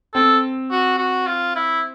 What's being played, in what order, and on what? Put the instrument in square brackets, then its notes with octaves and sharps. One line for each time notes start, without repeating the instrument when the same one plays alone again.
[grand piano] C4 [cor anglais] A4
[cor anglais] F#4
F#4
F4
E4